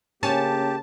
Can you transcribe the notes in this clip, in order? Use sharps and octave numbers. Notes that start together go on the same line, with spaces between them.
C#3 A#3 C#4 G4 A5